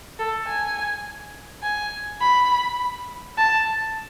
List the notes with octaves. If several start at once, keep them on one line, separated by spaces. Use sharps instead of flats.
A4
G#5
G#5
B5
A5